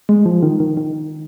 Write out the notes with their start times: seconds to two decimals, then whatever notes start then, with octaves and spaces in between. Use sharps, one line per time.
0.09 G#3
0.26 F3
0.43 D#3
0.60 D#3
0.77 D#3